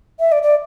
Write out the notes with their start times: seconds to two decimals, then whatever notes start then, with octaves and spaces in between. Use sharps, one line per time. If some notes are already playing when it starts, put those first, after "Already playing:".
0.19 E5
0.31 D5
0.42 D5